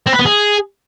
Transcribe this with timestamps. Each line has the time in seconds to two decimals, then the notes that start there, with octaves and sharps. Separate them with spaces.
0.06 C4
0.13 B4
0.19 B3
0.26 G#4